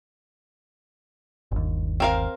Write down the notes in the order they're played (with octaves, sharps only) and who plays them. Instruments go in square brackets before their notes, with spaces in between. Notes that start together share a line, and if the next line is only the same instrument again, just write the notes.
[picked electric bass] G1 D#2
[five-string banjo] C4 A#4 F5